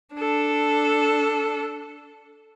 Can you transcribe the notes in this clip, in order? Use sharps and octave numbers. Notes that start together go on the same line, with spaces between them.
D4 A4